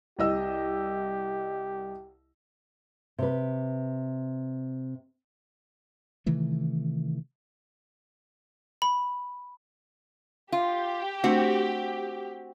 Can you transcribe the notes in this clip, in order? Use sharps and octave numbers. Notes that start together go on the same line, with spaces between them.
C2 G4 D#5 E6
C3 B4
C3 D#3 E3 A3
B5
F4 G4
A3 C4 D4 F#4 C5